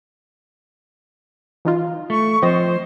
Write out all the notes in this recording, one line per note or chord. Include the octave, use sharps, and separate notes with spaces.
E3 D#4 F4
A3 C#6
F3 C4 C5 D#5